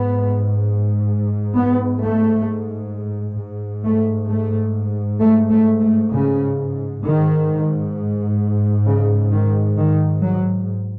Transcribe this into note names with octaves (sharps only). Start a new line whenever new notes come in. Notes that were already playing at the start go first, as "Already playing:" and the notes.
Already playing: G#2 B3
B3
A3
G#2
A3
A3
A3
A3
A3
C#3
G#2 D#3
C#3
D#3
D#3
F#3